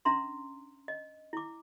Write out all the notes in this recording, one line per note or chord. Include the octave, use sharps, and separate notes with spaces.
C#4 D4 E5 A#5 C6
D#5
E4 D6